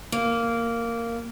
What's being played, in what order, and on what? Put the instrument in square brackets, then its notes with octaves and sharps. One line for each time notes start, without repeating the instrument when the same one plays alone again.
[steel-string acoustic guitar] A#3